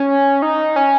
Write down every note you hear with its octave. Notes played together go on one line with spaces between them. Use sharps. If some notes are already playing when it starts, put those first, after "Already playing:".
Already playing: C#4
D#4
C#4